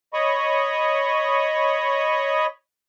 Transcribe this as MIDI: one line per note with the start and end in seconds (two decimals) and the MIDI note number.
0.14 2.47 73
0.14 2.47 75
0.14 2.47 83
0.14 2.47 85
0.14 2.47 87